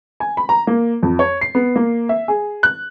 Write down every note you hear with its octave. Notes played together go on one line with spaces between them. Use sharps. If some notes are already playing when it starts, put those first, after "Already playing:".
G#5
B5
A#5
A#3
F2
C#5
C7
B3
A#3
E5
G#4
F#6